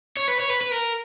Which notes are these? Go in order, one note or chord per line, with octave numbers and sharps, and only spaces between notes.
C#5
B4
C#5
B4
B4
A#4